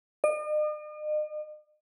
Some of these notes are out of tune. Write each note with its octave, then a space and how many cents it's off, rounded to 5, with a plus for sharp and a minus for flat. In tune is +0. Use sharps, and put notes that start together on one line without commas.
D#5 -45